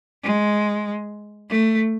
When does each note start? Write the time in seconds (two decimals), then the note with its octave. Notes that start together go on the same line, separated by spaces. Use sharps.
0.24 G#3
1.50 A3